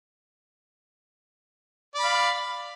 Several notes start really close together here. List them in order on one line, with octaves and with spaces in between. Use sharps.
D5 B5 F5